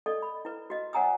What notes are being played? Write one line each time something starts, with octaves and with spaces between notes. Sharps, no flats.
A4 D5 D#5
B5
E4 B4
F#4 D#5
C#5 F#5 G#5 A#5 D#6 E6